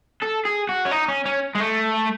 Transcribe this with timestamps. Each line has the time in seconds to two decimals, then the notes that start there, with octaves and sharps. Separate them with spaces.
0.23 A4
0.45 G#4
0.69 F#4
0.85 C#4
0.91 D#4
1.08 C#4
1.25 C#4
1.55 G#3
1.60 A3